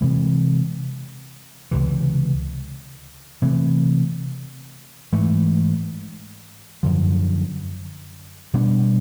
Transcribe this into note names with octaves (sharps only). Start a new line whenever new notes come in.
C3 E3 G#3
C#2 C3 E3
C3 E3 A3
G#2 E3 A3
F#2 D3 F3
B2 G3 B3 D4